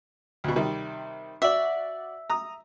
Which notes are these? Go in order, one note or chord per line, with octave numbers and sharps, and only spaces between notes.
D2 B2
C3 D#3 G3
F#4 D5 E5
A#5 D#6